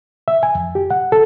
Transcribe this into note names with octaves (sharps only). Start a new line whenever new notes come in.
E5
G#5
F2
G4
F#5
A4